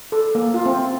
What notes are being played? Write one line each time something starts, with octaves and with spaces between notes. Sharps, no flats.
A4
A#3
F4
C4